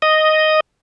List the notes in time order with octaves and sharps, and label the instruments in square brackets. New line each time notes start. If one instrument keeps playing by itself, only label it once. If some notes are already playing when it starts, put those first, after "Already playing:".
[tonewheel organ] D#5